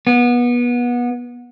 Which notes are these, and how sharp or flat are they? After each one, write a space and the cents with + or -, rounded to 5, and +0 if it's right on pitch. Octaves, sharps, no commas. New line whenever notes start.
B3 -25